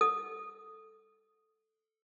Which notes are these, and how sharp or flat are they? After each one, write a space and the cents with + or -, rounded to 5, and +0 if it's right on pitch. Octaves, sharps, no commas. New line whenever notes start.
A4 +0 D#6 +0